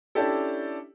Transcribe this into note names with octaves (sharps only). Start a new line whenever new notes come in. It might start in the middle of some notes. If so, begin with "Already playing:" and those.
C#4 D4 E4 G4 A4